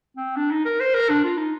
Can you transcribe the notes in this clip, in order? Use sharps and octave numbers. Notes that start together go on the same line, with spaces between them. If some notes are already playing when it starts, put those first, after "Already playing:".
C4
D4
D#4
A#4
C5
A#4
D4
F4
D#4